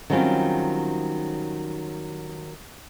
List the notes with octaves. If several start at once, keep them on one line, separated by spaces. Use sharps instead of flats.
D#3 F#3 G3 C4 C#4 F4